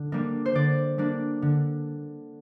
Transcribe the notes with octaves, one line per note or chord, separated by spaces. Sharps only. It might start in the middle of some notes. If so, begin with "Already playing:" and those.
Already playing: D3
G3 A#3 D4
C5
D3 D5
G3 A#3 D4
D3